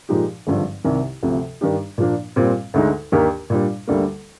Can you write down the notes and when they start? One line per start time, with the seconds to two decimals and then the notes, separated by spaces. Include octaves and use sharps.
0.09 A#2 F3 G#3 D#4 G4
0.47 G#1 G2 D3 F3
0.84 C2 C3 D#3
1.23 D2 C3 F3
1.61 G2 D#3 G3 D4 G4
1.98 A#2 F3 A#3 D4
2.36 A#2 G3 C4
2.74 D2 D3 G#3 D#4
3.12 D#2 D#3 A#3 D4 G4
3.50 A#2 G3 D4
3.87 D2 D3 G3 A#3